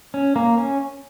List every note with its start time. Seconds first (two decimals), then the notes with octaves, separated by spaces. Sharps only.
0.14 C#4
0.36 A#3
0.58 C#4